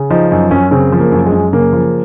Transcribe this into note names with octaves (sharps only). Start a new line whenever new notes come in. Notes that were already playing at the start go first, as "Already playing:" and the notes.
Already playing: C#3
F3 D#4
F#2 D#4
F#2 C#4
C#3 C4
F3
A#3
F#2
G#3
F#2
C#3 A#3
F3